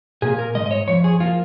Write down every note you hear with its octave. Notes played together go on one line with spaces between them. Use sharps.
A#2 A#3 G#4
A#4
G#2 D#3 G#3 D#5
D#5
C#5
F2 F3 C#5
G#4
F3 A#3 F4